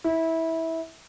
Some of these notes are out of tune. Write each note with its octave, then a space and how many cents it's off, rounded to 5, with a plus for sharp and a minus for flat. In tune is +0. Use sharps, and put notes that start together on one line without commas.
E4 -20